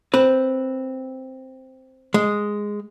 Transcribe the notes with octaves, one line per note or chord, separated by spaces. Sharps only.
C4 B4
G#3